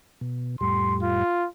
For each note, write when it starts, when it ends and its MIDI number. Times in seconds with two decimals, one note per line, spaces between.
0.21 0.56 47
0.61 1.24 41
0.61 1.24 45
0.61 1.24 55
0.61 0.96 84
1.02 1.47 65